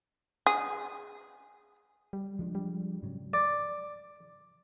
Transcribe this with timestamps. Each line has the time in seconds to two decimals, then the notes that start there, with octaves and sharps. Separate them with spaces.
0.46 G#4
2.13 G3
2.39 F3 G#3 D4
2.55 G3
3.02 G#2 C#3 F#3
3.34 D5